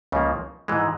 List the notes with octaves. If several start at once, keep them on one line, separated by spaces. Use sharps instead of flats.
C#2 C#3 F3 A#3
G#2 E3 G#3